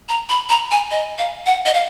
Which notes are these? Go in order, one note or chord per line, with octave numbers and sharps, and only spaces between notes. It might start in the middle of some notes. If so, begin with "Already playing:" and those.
A#5
B5
A#5
G#5
D#5
F5
F#5
D#5
F5